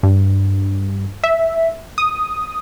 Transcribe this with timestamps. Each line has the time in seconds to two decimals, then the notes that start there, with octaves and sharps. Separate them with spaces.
0.03 G2
1.24 E5
1.98 D#6